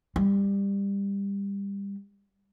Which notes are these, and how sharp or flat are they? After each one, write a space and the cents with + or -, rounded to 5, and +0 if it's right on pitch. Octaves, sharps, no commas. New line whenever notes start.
G3 +20